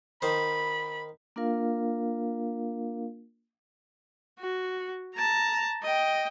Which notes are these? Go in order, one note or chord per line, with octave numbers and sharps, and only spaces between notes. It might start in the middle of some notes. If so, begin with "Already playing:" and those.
D#3 C5 B5
A#3 D4 F4 A#4 F5
F#4
A5 A#5
D#5 G5